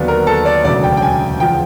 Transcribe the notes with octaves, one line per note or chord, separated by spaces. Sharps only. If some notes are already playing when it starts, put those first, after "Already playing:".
Already playing: D#2 D3 F#3 B3 D4
A#4
A4
D5
E1 D2 C#3 F#3 D5
G5
G5
G#5
E2 C#3 F3 G5